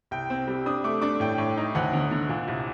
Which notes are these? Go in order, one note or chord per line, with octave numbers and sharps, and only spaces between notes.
C2 G5
C4
G3
D4 D#6
A3 D6
D4 D6
A2 G5
A2
D#4
D2 F#5
D3
D3
A#2
C2